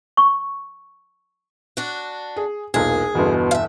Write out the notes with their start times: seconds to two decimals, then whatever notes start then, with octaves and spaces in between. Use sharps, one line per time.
0.17 C#6
1.77 D4 F#4
2.36 G#4
2.74 E1 B1 A#2 G#4
3.15 G1 E2 B2
3.51 E5 F5